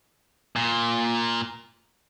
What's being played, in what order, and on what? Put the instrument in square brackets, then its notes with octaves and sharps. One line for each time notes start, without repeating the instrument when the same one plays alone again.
[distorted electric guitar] A#2